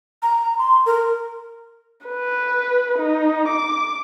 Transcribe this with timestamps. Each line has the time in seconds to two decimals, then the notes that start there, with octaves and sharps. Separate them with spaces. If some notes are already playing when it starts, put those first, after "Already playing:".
0.23 A#5
0.58 C6
0.86 A#4
2.07 B4
2.98 D#4
3.48 D6